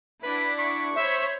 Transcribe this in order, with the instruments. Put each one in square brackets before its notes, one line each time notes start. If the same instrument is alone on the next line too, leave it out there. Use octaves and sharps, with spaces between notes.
[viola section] D4 E4 F#5 [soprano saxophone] B4 [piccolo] B6
[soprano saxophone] C#6 [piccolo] B6
[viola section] C5 C#5 B5 [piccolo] E5